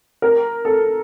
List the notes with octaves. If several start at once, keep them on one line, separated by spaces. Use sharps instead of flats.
A#4
A4